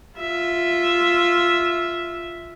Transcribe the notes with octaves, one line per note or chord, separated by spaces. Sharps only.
F4 E5